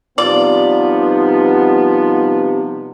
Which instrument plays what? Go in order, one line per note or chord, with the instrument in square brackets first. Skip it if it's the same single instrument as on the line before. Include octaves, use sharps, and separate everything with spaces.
[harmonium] C3 [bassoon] F3 [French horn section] G3 B3 D#4 [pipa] D5